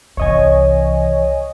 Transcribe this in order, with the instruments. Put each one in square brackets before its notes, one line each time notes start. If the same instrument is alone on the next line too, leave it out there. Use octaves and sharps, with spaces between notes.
[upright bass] C2 E3 [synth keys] C#5 D#5 G#5